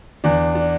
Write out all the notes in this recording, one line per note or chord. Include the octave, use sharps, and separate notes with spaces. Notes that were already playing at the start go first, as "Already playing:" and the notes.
E2 D4
D4